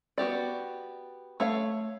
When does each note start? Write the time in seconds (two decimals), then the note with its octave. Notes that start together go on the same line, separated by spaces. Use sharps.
0.18 B3 F#4 G4 D5
1.40 A3 C#5 F5